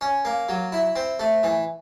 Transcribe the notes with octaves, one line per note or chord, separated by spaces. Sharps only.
C#4
A#3
F#3
E4
C4
A3
E3